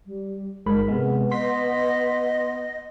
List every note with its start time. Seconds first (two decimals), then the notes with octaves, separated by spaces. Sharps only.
0.06 G3
0.66 G1 G#2 A#4 B5
0.88 C3 G#3 B3
1.31 D#5 C6 B6